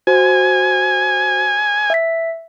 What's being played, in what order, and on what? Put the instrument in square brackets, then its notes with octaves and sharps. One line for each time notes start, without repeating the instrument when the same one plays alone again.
[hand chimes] F#4 C5 [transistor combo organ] G#5
[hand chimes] E5 B6